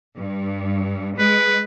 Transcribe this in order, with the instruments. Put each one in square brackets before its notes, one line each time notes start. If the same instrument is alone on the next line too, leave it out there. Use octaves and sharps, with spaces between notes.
[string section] G2
[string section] G#3 [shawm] B4